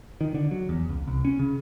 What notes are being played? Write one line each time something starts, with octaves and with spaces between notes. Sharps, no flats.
D#3
D3
F#3
E2
C#2
C2
C#4
C#3